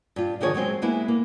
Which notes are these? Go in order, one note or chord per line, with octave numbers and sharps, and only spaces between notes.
G2 F4
D3 D#3 F3 G#4 A#4 C#5
F#3 G#3 C4 C5
G#3 A#3 B3 E4
A#3